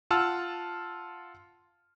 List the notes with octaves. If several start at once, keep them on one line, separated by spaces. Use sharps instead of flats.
F4 F#5 A5 E6 F6